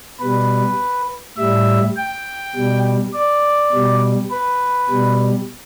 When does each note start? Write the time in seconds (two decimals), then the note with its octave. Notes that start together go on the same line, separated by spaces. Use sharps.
0.20 B2 G3 B4
1.37 A2 G3 E5
1.96 G5
2.55 B2 G3
3.13 D5
3.72 B2 G3
4.31 B4
4.90 B2 G3